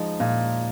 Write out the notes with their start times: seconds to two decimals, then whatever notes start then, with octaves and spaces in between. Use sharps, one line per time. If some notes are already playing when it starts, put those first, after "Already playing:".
Already playing: F3 G#3 D#4
0.20 A#2